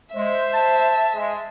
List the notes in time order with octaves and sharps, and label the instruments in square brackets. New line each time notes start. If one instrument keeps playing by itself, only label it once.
[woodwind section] G#3 [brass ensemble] C5 [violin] E5
[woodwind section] A5
[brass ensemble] G#3